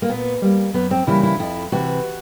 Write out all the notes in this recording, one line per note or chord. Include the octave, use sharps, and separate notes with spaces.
A#3
A#2 B3
G3 A#3
F#2 B3
C4
C#3 E3 G3 A#3 E4
E4
F2 E4
C3 E3 F#4